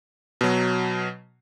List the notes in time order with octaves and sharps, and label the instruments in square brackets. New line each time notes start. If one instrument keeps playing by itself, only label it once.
[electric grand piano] B2 F#3